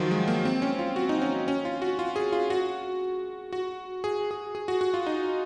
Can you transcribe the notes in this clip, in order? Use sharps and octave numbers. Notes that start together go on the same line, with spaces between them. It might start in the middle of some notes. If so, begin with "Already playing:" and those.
Already playing: D#3 F3 F#3 F4 F#4
G#3
A#3
C4
C#4
F4
F#4
D#4
C#4
C#4
F4
F#4
F4
G#4
F4
F#4
F#4
G#4
G#4
G#4
F#4
F#4
F4
D#4